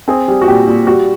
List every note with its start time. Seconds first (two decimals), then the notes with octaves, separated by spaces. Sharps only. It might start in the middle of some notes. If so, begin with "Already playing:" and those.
0.08 C4 G#4
0.28 G3
0.42 F#4
0.47 A#2 G4
0.67 A#2
0.87 G3 F#4